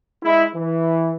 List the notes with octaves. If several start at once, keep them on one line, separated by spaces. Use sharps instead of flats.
G#3 E4
E3